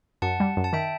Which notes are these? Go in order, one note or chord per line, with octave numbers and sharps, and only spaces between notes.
F#2 F#5 A5
G3
F#2
A5
D#3 E5 G5